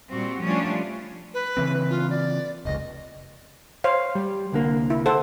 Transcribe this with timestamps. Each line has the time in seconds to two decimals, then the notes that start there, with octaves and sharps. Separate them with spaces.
0.11 A#2 G3 C4 F#4
0.43 F3 G3 A3 C#4 D4 F4
1.34 B4
1.57 C#3 E3 C4
1.90 F4
2.10 D5
2.65 F1 C#2 D#5
3.84 C5 C#5 F5
4.15 G3
4.52 C2 D3 A#3
4.90 E4
5.06 A4 C5 F#5